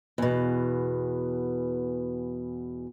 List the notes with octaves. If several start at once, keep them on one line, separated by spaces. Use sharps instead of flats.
E2 B2